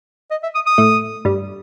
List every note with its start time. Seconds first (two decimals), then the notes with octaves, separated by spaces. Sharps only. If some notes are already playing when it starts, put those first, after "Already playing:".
0.31 D#5
0.43 E5
0.55 D#6
0.66 D#6
0.78 A2 A3
1.25 G2 G3